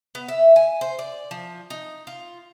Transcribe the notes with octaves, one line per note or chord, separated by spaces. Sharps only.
B3
E5
G#5
C5
D5
F3
D#4
F4